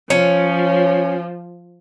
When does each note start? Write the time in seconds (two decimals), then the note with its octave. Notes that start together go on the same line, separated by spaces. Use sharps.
0.10 F3 C#4